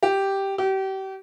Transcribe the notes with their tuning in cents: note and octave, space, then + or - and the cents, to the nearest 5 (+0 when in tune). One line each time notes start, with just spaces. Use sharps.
G4 -5
G4 -35